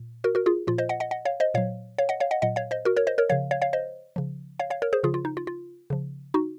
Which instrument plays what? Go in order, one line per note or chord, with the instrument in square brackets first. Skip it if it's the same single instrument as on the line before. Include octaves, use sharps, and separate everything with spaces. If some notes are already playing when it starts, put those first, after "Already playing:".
Already playing: [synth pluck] A#2
F#4 A#4
F#4 A#4
F4 G#4
A#2 F3 F4
C5 D#5
D#5 F#5
D#5 F#5
D#5 F#5
C#5 F5
C5 D#5
A#2 F#3 C#5 F5
C#5 F5
D#5 F#5
C#5 F5
D#5 F#5
A#2 F#3 D#5 F#5
C#5 F5
C5 D#5
F#4 A#4
A#4 C#5
C5 D#5
A#4 C#5
C#3 F3 C#5 F5
C#5 F5
C#5 F5
C5 D#5
C#3 F3
C#5 F5
C#5 F5
A#4 C#5
G#4 C5
C#3 F3 F4 G#4
F4
D#4
F4
F4
C#3 F3
D#4 F#4